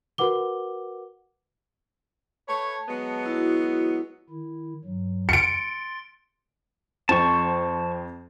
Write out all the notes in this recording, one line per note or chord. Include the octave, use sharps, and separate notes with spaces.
F#4 A#4 B4 F#5 D6 G7
A3 B4 C#5 A5
F#3 G#3 B3
E4 F#4
D#3 E4
G2 F#3
C6 A6 C#7 D7
F2 C4 A5 C#6